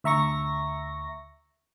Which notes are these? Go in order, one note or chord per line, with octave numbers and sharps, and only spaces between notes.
D2 E5 A#5 C#6 A#6